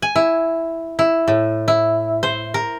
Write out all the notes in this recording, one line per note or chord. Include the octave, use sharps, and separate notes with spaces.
G#5
E4
E4
A2
E4
C5
A#4